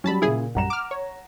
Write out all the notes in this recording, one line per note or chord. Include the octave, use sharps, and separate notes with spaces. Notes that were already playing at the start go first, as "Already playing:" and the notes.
F#3 G3 C#4 A5 B5
A#2 C#3 E4 G#4
A#1 F#2 G3 F#5 A#5 E7
D6 F6
C#5